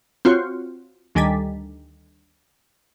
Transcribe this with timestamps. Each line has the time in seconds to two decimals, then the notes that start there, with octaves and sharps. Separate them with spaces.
0.25 C4 F4 F#4 C#5
1.15 D2 D#3 G3 G#5 A6 B6